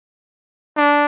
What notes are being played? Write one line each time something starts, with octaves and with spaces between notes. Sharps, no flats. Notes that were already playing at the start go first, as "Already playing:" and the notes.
D4